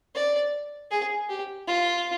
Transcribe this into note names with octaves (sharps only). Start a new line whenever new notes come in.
D5
G#4
G4
F4